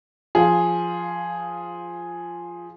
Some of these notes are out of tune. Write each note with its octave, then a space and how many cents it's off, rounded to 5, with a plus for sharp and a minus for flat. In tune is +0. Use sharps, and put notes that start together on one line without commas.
F3 +0 G#4 +0 F5 +15